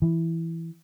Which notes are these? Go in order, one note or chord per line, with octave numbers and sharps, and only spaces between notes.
E3